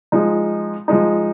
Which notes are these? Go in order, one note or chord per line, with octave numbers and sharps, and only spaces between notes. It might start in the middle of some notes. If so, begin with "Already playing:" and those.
F3 G#3 D#4
F3 G#3 D#4